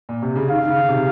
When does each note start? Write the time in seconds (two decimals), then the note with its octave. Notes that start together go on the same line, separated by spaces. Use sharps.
0.09 A#2
0.22 C3
0.36 C#3
0.50 D#3 F5
0.63 D#3
0.69 C#3
0.89 C3